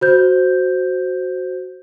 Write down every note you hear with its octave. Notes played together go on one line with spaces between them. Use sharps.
F#4 C5 G6